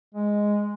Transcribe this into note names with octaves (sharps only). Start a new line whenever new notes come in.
G#3